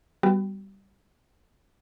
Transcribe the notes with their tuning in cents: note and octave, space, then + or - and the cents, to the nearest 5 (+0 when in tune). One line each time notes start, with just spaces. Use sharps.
G3 +0 B3 +10 F#4 +30